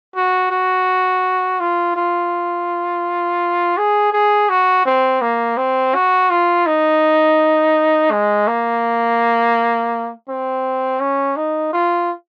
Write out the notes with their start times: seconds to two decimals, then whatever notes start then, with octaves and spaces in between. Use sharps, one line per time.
0.16 F#4
0.51 F#4
1.60 F4
1.96 F4
3.78 G#4
4.13 G#4
4.49 F#4
4.85 C4
5.22 A#3
5.57 C4
5.94 F#4
6.30 F4
6.66 D#4
8.11 G#3
8.47 A#3
10.28 C4
11.00 C#4
11.36 D#4
11.73 F4